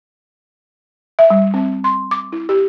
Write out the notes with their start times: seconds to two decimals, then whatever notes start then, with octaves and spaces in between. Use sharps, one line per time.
1.19 E5
1.30 G3
1.54 C4
1.84 C6
2.11 D6
2.32 E4
2.49 G4